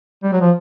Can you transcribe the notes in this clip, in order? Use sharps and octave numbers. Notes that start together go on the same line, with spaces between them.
G3
F#3
F3